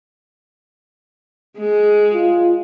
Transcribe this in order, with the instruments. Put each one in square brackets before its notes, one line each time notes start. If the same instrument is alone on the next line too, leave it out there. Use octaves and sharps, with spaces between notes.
[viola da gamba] G#3
[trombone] F4